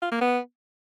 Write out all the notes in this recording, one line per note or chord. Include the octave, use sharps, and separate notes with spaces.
F4
A#3
B3